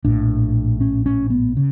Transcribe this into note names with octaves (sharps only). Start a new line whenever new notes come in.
A#1 A2 D4
C#4
C#4
B3
C#3